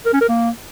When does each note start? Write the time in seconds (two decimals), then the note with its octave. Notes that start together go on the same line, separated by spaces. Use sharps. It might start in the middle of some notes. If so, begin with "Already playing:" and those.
0.06 A#4
0.13 C#4
0.21 A#4
0.29 A#3